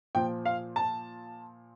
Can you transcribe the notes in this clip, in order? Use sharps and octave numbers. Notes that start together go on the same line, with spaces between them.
A#2 F3 G5
F5
A5